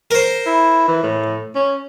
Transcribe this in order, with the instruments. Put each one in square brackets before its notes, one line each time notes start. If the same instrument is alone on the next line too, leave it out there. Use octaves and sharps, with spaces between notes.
[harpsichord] A#4 C5
[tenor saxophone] E4
E3
A2
C#4